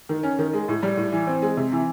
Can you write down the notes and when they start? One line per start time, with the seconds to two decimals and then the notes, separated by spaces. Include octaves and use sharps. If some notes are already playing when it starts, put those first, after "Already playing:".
0.09 D#3
0.23 C#4
0.39 D#3
0.53 G#3
0.68 A2
0.82 G3
0.97 A2
1.12 E3
1.27 C4
1.42 G#3
1.57 C3
1.72 E3